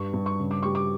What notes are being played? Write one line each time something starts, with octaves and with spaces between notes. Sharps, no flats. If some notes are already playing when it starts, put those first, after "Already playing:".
Already playing: G2 G3 C#6
G2
C#6
C#3
D6
G3 C#6
D6